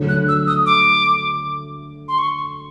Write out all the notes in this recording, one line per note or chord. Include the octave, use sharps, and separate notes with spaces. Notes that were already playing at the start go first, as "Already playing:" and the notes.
Already playing: D2 D3 F#3 A3
F#6
E6
D#6
D6
C6
C#6